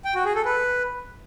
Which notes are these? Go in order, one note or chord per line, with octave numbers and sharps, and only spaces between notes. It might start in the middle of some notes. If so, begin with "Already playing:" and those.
G5
F#4
G#4
A4
B4